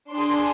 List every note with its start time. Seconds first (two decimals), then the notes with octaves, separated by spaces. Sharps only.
0.12 D4 G#4 C6